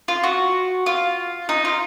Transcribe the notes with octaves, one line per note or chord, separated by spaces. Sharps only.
F4
F#4
F4
D#4
F4